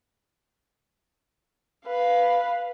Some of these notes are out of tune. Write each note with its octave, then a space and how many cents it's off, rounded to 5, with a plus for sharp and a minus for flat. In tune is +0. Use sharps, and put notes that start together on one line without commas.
B4 +0 F5 +0